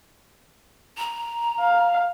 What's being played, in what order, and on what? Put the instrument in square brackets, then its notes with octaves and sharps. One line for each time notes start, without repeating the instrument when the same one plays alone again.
[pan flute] A#5
[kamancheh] F5